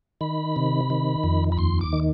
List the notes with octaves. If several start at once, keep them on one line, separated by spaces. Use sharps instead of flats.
D#3 B5
C3
D#3
F2
B5
D#2 C6
D6
D#3